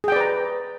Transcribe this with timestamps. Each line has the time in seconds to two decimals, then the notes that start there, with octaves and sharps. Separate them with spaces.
0.04 G#4
0.08 G5
0.12 D5
0.16 B4
0.20 A#5